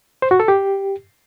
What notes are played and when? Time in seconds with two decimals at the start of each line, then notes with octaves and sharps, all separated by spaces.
0.22 C5
0.31 F#4
0.40 A4
0.48 G4